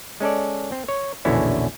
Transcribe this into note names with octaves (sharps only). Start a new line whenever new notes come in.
G#3 C#4 A4 D5
C4
C#5
A#1 E2 B2 D3 C#4 E4